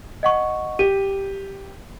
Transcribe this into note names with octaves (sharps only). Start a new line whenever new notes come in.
D#5 F#5 C#6
G4 D#7